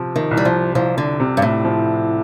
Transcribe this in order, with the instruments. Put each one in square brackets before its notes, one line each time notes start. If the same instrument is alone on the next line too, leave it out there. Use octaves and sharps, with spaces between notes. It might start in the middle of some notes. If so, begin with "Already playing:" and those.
Already playing: [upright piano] C3 F3
[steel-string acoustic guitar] D#3
[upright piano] C2
[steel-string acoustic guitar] G3
F3
[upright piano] C2 [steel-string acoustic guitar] F3
[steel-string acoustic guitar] D3
[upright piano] C3
[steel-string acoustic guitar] G2
A2
[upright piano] F3